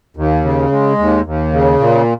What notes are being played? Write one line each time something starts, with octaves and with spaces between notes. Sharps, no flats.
D#2
C#3
G#3
D#2
D#2
C#3
A#2